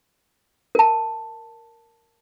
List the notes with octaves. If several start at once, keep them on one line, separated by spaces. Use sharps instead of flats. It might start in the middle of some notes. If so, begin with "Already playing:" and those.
A#4 A5